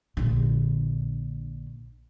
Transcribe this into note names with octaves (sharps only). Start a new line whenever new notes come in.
A#1 D3